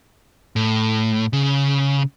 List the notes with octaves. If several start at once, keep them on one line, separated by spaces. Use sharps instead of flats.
A2
C#3